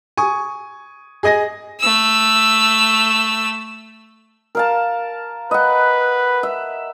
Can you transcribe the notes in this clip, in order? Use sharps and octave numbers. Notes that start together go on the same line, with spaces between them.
G#5 C#6 D#6
G#4 D#5 G#5 A#6
A3 E6
A#4 F5 A5
B4 D#5 F#5
E5